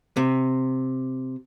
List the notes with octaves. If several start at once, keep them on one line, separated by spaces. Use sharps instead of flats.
C3